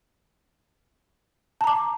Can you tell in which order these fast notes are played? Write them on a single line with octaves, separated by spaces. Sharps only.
A5 A#5 D6